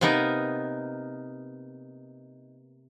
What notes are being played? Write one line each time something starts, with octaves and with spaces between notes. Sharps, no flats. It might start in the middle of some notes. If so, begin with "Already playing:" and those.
C3 A#3 B3 D#4 A#4